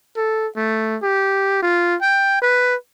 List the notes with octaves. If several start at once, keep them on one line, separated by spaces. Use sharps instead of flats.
A4
A3
G4
F4
G5
B4